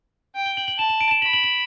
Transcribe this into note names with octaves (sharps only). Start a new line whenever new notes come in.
G5
G7
F#7
F#7
A5 E7
E7
D7
E7
B5 F#7
F#7
F#7